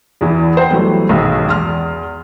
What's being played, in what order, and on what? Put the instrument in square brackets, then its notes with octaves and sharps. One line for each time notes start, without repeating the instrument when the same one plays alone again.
[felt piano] E2 E3
C5 F#5 G5
E3 F#3 G3 A3 B3
B1 G#2 D#3
E2 C6 F6